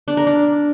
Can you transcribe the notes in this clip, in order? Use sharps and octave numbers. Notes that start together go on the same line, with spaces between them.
D4
A#4
D4